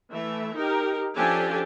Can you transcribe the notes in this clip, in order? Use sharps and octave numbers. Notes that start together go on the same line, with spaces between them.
E3 A3 E5
D#4 G4 A#4
F3 C#4 D4 G4 A4 G#5